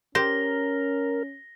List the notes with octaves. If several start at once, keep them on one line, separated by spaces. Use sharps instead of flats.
C#4 G4 A#4 C5 A#6 G7